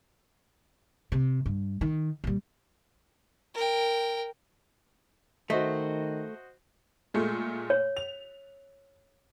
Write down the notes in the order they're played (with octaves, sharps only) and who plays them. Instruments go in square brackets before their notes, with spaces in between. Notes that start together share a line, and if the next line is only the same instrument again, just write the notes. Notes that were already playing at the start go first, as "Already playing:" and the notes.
[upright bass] C3
G2
D#3
A#2 G3
[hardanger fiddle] A#4 G5
[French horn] D#3 [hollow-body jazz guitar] A3 [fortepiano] F#4 C5 D#5
[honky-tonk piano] A#2 G#3 A3
[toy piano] C#5
[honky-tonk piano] F7